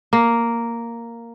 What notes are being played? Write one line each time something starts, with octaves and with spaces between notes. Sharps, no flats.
A#3